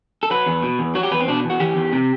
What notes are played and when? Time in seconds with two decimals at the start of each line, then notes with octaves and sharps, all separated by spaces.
0.23 A4
0.30 F#3 B4
0.46 E2
0.63 B2
0.79 E2
0.95 F#3 F#4
1.03 G4
1.11 E2 B4
1.20 C4
1.28 B2 D4
1.44 E2
1.50 F#4
1.60 E3 G4
1.76 E2
1.92 C3